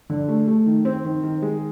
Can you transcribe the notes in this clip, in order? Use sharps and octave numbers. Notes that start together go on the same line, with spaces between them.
D3
A3
A3
D#3
C4
D#3
D#3
G#3